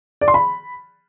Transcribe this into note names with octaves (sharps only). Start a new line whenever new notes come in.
D5
C6
B5